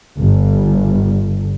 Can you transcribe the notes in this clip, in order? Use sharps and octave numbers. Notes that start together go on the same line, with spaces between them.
G1